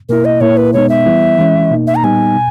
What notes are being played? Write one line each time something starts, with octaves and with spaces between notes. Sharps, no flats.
B2 A#3 E4 A#4
D#5
A#2 A#3 E4 C#5
B4
B2 G#3 B3 D#4 C#5
E5
E3 G3 B3 E4
E3 G#3 C#4 E4
B2 A#3 D#4
E5
A#5
A#2 G3 B3 D#4 G#5
B2